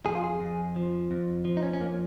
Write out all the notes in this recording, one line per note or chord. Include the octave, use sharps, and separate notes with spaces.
F2 G#4
F4
G#4
F2
F3
F2
F3
D#4
C#4
C#4
F2 A#3